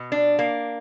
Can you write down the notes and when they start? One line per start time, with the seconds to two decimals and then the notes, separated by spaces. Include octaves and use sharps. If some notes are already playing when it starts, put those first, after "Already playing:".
Already playing: B2
0.12 D4
0.39 A#3